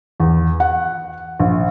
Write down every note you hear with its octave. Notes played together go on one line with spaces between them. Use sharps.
E2
F#5
A#1